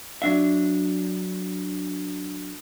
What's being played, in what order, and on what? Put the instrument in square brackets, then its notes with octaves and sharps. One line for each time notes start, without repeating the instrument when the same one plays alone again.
[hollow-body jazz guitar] F#3 D4 E5